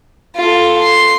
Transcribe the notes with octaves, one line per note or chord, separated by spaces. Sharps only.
F4 A4
C6